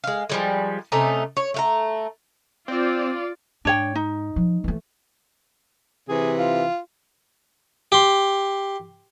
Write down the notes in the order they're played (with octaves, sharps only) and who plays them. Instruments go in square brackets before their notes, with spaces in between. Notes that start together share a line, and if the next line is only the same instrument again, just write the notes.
[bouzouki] G#3 F5
F3 G3 G#3
C3 A3 C#4 D#4
C#5
A3 F5 A#5
[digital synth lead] C4 [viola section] F4 D5
[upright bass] G#2 [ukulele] D4 C#5 G5
[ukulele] D#4
[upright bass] F3
E3 A3
[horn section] C3 E3 [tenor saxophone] G#4
[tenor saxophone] F4
[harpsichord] G4 C6